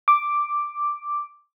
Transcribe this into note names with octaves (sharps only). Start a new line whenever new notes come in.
D6